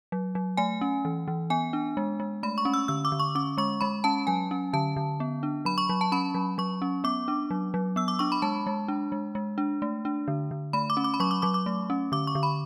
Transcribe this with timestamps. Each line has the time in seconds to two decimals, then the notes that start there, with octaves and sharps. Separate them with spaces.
0.12 F#3
0.35 F#3
0.57 A3 G#5
0.81 C#4
1.05 E3
1.28 E3
1.50 B3 G#5
1.73 D4
1.97 G#3
2.20 G#3
2.43 A3 B5
2.58 C#6
2.65 C#4
2.74 E6
2.88 D3 E6
3.05 D6
3.12 D3
3.19 C#6
3.35 C#4 D6
3.58 G#3 C#6
3.81 G#3 B5
4.04 C#4 A5
4.27 F#3 G#5
4.51 C#4
4.73 D3 A5
4.96 D3
5.20 B3
5.43 D4
5.65 F#3 B5
5.78 C#6
5.89 F#3
6.01 A5
6.12 C#4 B5
6.35 F#3
6.58 F#3 C#6
6.82 C#4
7.04 B3 D6
7.28 D4
7.50 F#3
7.74 F#3
7.96 B3 E6
8.08 D6
8.19 D4 C#6
8.32 B5
8.42 G#3 A5
8.67 G#3
8.88 D4
9.12 G#3
9.35 G#3
9.58 D4
9.82 A3
10.05 D4
10.28 D3
10.51 D3
10.73 A3 B5
10.90 D6
10.97 C#4
11.04 D6
11.14 B5
11.20 F#3 C#6
11.31 D6
11.42 F#3 D6
11.54 D6
11.66 A3
11.90 C#4
12.12 D3 D6
12.27 C#6
12.35 D3
12.43 B5